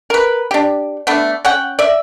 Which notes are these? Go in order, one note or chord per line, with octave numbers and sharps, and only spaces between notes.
A#4 B4
D4 G4
A3 B3 D4
C#4 F#5 G5
D5 E5